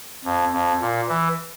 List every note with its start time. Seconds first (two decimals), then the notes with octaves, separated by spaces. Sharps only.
0.25 F2
0.53 F2
0.81 A#2
1.09 E3